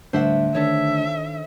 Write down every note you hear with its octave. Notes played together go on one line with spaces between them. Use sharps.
D1 D3 G3 A3 D4 C5 E5 F#5
D#3 D4 A4 C#5 E5